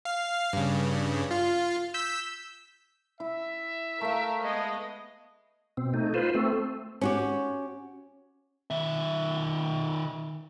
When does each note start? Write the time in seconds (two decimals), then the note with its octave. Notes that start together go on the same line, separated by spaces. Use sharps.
0.05 F5
0.53 G2 C#3
1.31 F4
1.94 E6 G6 B6
3.20 E4 E5
4.01 A3 A#4 F5
4.43 G#3 B3 D#5
5.77 B2 C4
5.94 A3 D#4
6.14 F4 B4 C5
6.35 A3 C4
7.01 C#4 F#4 G4
8.70 D#3 E5